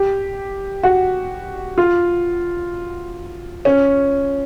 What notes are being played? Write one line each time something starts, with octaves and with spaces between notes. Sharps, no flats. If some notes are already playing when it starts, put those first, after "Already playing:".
Already playing: G4
F#4
F4
C#4